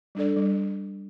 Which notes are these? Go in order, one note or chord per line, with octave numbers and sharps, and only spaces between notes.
G3 D4 A4 D5
G3